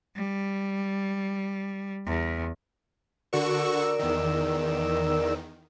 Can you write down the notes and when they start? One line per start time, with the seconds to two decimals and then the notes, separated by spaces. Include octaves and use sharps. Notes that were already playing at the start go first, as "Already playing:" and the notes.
0.16 G3
2.06 E2
3.33 D3 F#4 A#4 D5 C#6 E6
3.99 E2 D#3